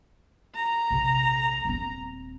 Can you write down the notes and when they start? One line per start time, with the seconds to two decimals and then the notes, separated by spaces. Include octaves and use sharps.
0.56 A#5
0.90 A#1 C3
1.65 D#1 C4